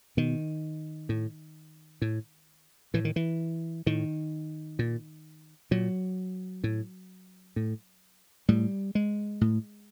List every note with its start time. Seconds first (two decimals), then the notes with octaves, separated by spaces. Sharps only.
0.17 B2 D#3
1.09 A2
2.02 A2
2.94 A2 E3
3.05 D#3
3.16 E3
3.86 A2 D#3
4.79 A#2
5.71 A#2 F#3
6.64 A2
7.56 A2
8.48 A2 G3
8.95 G#3
9.41 A2